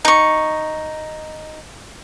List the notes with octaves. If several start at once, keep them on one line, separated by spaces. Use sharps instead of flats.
D#4 C#6